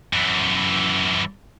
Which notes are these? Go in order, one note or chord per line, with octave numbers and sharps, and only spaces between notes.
F#2 E3